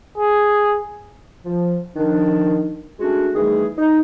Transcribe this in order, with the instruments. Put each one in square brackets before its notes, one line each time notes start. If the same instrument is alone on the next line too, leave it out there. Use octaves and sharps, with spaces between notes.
[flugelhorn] G#4
[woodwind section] F3
D#3 F3 D4
G#3 A3 C#4 D4 F#4
D#3 E3 G3 A3 G#4
D#4